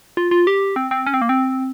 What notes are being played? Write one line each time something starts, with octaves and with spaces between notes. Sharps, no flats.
F4
F4
G4
C4
C4
C#4
C4
A#3
C4